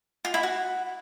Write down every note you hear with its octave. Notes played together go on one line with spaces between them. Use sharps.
F4
E4
F#4